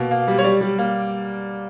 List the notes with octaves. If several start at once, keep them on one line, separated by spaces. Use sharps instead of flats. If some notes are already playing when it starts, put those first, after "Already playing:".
Already playing: B2 A#3
A#3
G3
C#5
G3 D5
G3
A#3